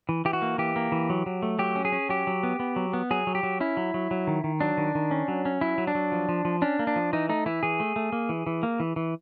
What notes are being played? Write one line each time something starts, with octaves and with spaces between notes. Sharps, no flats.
E3
E3 G4
F#4
A#3
E3 G4
A#3
E3
F#3
F#3
A3
F#3 G4
C#4
G#4
C#4
F#3 G4
F#3
B3
B3
F#3
B3
F#3 G#4
F#3
G4
F#3
C#4 E4
F#3
F#3
F#3
D#3
D#3
F#3 D4
D#3
D#3
C#4
F#3
C#4
F#3 E4
F#3
D4
F#3
F3
F3
F3
C#4 D4
A#3
D4
F3
E3 D#4
A3 D#4
E3 E4
E3 G#4
A3
A3
A#3
E3
E3
A#3
E3
E3